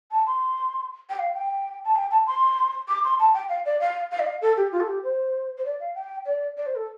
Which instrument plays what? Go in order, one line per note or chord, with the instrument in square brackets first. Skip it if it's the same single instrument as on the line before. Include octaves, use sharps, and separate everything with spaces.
[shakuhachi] A5
C6
G5
F5
G5
A5
G5
A5
C6
D6
C6
A5
G5
F5
D5
F5
F5
D5
F5
A4
G4
F4
A4
G4
C5
C5
D5
F5
G5
D5
D5
C5
A4